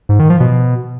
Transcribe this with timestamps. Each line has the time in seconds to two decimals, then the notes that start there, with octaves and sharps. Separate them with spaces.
0.09 G#2
0.19 D#3
0.30 F3
0.40 B2